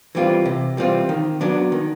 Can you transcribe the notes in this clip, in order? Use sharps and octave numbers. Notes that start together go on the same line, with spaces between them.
E3 G3 C4 F4
C3
E3 G3 C4 F4
D#3
F#3 B3 D4
D#3